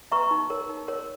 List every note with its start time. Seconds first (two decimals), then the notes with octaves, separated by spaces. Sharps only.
0.12 B4 E5 A#5 C#6
0.31 D#4
0.50 A#4 C#5
0.69 D#4
0.88 A#4 C#5